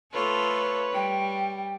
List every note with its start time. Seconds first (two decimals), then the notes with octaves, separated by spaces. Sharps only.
0.12 A3 F4 A4 B4 C#5
0.93 G3 G5